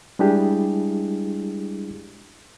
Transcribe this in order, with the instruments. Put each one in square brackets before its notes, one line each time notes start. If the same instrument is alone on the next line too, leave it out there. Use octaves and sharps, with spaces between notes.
[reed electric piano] G3 G#3 D4 E4 G4 G#4